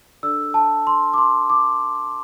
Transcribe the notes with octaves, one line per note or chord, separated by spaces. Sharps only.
D4 A4 D5 E6
A5
C6
D6
C6
D6